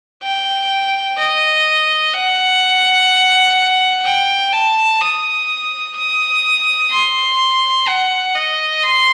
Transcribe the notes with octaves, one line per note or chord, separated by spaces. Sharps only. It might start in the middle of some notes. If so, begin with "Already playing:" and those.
G5
D#5
F#5
G5
A5
D#6
D#6
C6
F#5
D#5
C6